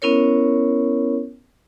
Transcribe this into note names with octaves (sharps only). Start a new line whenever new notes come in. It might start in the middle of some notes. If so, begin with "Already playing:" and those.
B3 C#4 E4 A#4 C#5